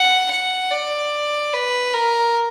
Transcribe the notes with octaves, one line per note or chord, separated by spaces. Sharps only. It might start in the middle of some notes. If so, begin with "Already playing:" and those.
Already playing: F#5
F#5
D5
B4
A#4